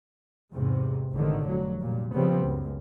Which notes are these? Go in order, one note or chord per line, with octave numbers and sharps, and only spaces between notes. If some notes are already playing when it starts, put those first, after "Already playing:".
E2 G#2 C3
G#1 A2 D3 D#3
F1 F#3
G2 A#2
C#3 F3 G3 B3 C4
C#2 F#2